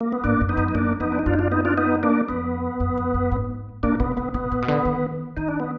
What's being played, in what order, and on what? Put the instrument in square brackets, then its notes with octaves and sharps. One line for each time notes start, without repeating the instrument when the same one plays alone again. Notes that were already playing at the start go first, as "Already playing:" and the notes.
[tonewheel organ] A#3
B3
[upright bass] G#2 [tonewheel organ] A#3 D4
[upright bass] F#2
[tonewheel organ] B3 D#4
[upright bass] F#2
[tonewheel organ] D#4
[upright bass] F#2 [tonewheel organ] A#3 D4
[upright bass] F2 [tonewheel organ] B3 D#4
[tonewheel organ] D4
D#4
[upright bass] F#2 [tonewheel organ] D4 F4
[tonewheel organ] D#4
D4 F4
B3 D#4
D4 F4
B3 D#4
A#3 D4
[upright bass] F2 [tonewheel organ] B3
[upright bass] F#2
F2
F#2
G#2
[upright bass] A#2 [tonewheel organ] A#3 D4
[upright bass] B2 [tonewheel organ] B3
[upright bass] D3 [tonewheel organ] B3
[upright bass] B2 [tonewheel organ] B3
[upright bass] A#2
B2
D3
D#3
[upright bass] D#3 [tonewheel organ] D#4
[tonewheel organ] D4
B3